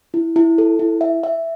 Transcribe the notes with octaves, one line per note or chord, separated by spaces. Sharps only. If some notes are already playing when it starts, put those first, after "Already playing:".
E4
E4
A4
E4
E5
E5